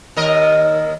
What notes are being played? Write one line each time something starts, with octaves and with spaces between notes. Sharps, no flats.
D#2 A#4 D#5